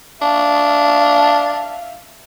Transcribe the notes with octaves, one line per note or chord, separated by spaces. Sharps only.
D4 E5 F5